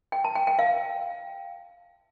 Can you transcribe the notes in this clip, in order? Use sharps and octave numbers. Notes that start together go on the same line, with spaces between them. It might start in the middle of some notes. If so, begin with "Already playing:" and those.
G5
A5
G5
G5
F5